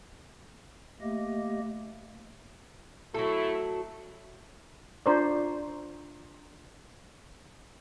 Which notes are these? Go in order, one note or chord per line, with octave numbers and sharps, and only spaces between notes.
A3 A#3 G4 D#5
F#3 A3 E4 A4
D4 F4 C5 D5 A#5 C#6